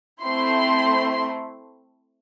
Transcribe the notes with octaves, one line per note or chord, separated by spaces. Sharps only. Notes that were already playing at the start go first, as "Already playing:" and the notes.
A3 C4 E4 C6